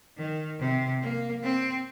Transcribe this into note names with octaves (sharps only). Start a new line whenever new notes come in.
D#3
C3
A#3
C4